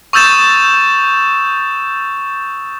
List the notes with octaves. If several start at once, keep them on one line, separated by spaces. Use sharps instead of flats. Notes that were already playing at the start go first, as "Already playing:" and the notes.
C#6 D#6 E6 G6 A6 E7